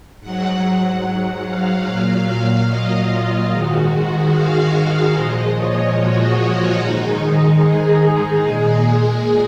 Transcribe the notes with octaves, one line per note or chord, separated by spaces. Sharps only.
G#2 F#3 F#5
F#5
F5
A#2 F#3
D#5
F4
G#2 D#3 G#3 F#4
F5
A#2 F3 G#3 D#5
C#5
F#4
G#2 D#3 G#3 D#4
G#4
A#2 G#3